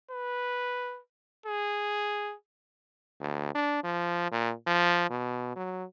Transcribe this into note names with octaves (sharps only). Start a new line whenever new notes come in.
B4
G#4
D2
D4
F3
A#2
F3
B2
F#3